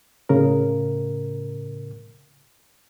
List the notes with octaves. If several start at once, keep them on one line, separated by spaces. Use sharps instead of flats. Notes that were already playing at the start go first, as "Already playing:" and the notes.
A2 C#3 A#4